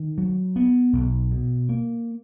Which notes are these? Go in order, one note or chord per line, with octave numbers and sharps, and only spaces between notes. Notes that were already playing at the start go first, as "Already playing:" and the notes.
Already playing: D#3
F#3
B3
B1
B2
A#3